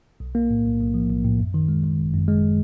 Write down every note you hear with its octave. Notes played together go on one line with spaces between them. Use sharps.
B1
A#3
A2
B1
B1
F3
B1
A2
F#2
D#3
G#3
D#3
G1
F#2
G#3